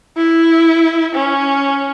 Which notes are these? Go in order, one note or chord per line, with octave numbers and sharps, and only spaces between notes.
E4
C#4